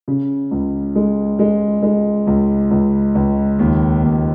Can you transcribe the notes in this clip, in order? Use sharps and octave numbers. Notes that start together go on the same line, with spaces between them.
C#3
C#2
G#3
G#3
G#3
C#2
C#2
C#2
D#2
D#2